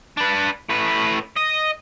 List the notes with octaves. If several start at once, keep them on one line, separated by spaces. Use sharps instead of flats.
D4 B4
A2 B4
D#5